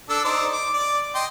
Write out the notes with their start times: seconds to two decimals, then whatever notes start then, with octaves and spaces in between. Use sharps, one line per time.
0.09 D4 A4 E6
0.24 D#4 C5 D5
0.53 D6
0.74 D5
1.15 D#5 G5 C6